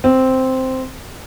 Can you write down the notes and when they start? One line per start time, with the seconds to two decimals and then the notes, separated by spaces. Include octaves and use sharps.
0.04 C4